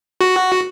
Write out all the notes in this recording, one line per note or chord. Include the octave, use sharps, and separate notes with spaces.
F#4